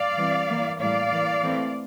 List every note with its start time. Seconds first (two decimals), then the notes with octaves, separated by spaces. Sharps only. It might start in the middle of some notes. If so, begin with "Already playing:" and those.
Already playing: D5 F5
0.17 E3 G3 C4
0.49 E3 A#3
0.80 A2 E3 G3 A#3 D5 F5
1.12 E3 A#3
1.43 E3 A3 C4